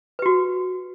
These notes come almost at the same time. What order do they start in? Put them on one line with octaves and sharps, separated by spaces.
B4 G4 F#4